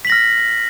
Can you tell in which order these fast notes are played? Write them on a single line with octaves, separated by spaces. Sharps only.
B6 F#7 A#6 F6